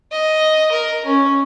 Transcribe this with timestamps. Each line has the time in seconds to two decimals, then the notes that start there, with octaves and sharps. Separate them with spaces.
0.12 D#5
0.72 A#4
1.05 C#4